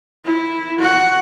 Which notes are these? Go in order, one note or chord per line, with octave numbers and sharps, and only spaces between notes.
E4
F#4 F#5